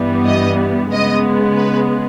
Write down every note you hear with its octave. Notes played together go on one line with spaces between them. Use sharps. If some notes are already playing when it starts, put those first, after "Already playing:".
Already playing: G2 E3 G3 B3
D#5
C#3 G#3 B3 D#5
B4